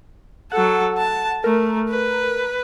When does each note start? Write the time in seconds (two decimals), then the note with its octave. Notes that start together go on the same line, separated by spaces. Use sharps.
0.52 F#3 A4 F#5
0.98 A5
1.44 A3 A#4
1.89 B4